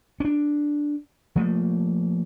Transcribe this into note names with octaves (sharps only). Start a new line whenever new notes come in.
C#4 D4
F3 A3 A#3